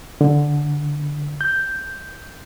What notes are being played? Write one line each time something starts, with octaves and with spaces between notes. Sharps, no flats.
D3
G6